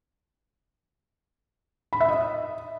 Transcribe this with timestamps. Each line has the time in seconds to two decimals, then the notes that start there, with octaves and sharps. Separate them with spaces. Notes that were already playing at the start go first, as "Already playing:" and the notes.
1.93 B5
2.01 E5
2.09 D#5